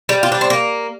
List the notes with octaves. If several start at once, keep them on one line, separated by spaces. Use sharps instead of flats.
G3
F4
D4
C4
A#3